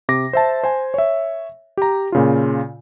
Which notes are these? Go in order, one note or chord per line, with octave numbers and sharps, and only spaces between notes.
C3 D6 A#6
C5 E5 A5
C5 G#5
C#5 E5
G4 A#5
A#2 C#3 F4